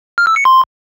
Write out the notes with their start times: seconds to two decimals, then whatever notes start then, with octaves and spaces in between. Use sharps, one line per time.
0.18 F6
0.27 E6
0.36 C#7
0.45 C6